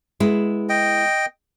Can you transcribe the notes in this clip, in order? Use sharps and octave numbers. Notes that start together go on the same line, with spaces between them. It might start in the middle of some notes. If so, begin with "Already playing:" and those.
G#3 B3 E4
D#5 G5